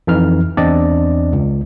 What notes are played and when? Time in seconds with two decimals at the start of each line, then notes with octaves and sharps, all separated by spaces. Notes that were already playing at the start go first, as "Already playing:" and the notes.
0.07 F2 E3 D#4 F6
0.57 E2 C4 D4 D5 D#5
1.33 C#2